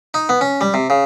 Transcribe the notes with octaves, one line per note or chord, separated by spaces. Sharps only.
D#4
B3
C#4
G3
C3
C#3